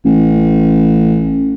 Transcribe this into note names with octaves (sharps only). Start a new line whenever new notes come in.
A1